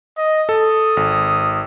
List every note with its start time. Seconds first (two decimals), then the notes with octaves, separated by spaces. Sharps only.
0.18 D#5
0.49 A4 D#6
0.97 G#1